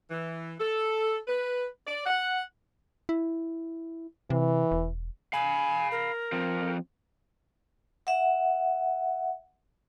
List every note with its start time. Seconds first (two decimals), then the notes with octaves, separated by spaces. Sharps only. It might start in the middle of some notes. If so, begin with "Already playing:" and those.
0.11 E3
0.60 A4
1.28 B4
1.87 D5
2.06 F#5
3.09 E4
4.30 C3 E3
4.71 E1
5.33 F5 G#5 B5
5.91 A#4
6.32 F3 C4
8.07 E5 F#5